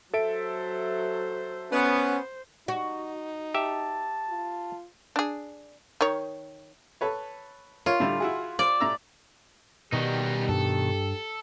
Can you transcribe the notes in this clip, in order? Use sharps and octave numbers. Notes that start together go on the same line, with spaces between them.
F#3 A4 C5 E5 D7
B3 C#4 C5
D#4 F#4
G4 E5 A5
F4
D4 G#4
D#3 C#5
A4 B4 C#5
F4 A#4 C#5
A2 D3 G3
E4 F#4 G#4
C5 D5 F5
A2 A#5 E6
B2 D#3 G3 D#4 F#4 G4
G2 A4